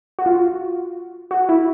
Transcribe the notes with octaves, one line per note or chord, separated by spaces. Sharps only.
F#4
F4
F#4
E4